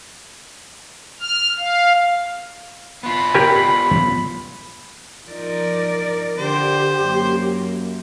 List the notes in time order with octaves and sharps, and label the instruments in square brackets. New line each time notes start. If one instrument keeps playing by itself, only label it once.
[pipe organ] F6
F5
[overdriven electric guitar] B3 F4 [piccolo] B5
[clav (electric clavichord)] G4 A#4 G#5
[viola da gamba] F3 D#4 [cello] A#4 D5
[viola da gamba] D3 [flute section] G4 [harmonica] C5
[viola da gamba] F#2 [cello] A#3